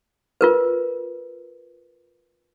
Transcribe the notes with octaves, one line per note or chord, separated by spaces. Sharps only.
F4 A#4 B4